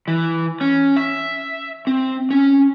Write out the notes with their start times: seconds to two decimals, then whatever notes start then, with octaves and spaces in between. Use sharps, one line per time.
0.08 E3
0.61 C#4
0.97 E5
1.87 C4
2.31 C#4